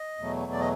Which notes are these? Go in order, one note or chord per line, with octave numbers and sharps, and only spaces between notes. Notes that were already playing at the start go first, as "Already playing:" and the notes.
Already playing: D#5
E2 B2 F#3 A3
D5
D#5